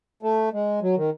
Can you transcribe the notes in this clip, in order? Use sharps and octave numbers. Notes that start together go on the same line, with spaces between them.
A3
G#3
F#3
D#3